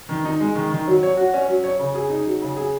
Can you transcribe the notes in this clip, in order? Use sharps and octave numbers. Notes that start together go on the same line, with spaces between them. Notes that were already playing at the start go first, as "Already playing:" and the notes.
D#3
D#4
G#3
D#3
D#3
F#3
C#5
F#4
C#4
F#3
C#5
C#3
G#4
D#4
F#3
C#3
G#4